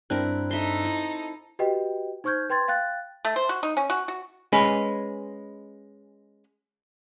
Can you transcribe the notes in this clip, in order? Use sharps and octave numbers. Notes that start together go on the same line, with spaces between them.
G2 C4 D4 E4 A#4 F#6
D#4 A4 E5 C6
E4
F#4 G4 B4 D#5 G5
D#4 C5 C#6 F6 G6 G#6
B4 G5 C6 G#6 A6
F5 G5 F#6 A6
A3
C5
F#4
D#4
C#4
F#4
F#4
G#3 C#4 B4